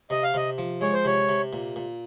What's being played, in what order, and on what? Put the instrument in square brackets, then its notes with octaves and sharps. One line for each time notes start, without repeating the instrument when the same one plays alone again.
[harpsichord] C3 [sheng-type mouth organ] D#5
[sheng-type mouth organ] F5
[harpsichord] C3 [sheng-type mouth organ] D#5
[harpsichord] F3
[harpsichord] G#3 [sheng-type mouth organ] C#5
[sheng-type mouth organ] C5
[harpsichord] C3 [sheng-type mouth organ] C#5
[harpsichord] C3
A#2
A#2